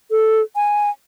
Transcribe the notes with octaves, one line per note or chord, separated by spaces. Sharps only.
A4
G#5